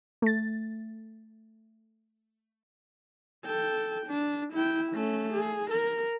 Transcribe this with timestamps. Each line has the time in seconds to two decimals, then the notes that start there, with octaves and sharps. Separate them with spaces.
0.22 A3 A6
3.46 A4 G5
4.07 D4
4.53 E4 G5
4.93 A3 C#4
5.33 G#4
5.71 A#4